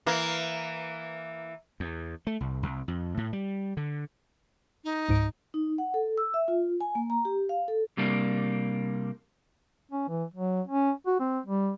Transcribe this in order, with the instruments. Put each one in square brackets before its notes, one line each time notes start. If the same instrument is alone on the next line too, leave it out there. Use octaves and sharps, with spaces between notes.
[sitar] E3 A#3
[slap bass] E2
A3
C2
C2
F2
A2
G3
D3
[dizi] D#4
[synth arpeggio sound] C#2 G#2 D7
[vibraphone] D#4
F#5
A4
E6
E5
F4
G#5
A#3
A#5
G4
F5
A4
[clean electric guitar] C3 G3 A#3 D4
[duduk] C#4
E3
F#3
C#4
F#4
C4
G3